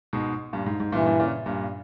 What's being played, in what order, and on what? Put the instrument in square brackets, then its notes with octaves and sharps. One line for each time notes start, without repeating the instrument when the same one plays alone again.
[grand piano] G#2 B2
G2 A#2
G#2
G#2
[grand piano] G2 A#2 [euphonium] E3
[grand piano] G2 A#2
A#2 C#3
G2 A#2